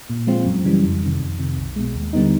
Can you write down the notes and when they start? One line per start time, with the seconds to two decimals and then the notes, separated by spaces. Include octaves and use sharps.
0.10 A#2
0.27 F3 G#3 C4 F4
0.46 F#2
0.65 C#3 E3 G3
0.84 F2
1.02 C3 D#3
1.20 F2
1.39 C3 D#3
1.58 B1
1.76 B2 G#3
1.95 D#2
2.13 D3 G3 B3 D#4